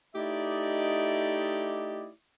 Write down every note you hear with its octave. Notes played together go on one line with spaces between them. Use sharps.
A3 D#4 E4 G4 D5 D#5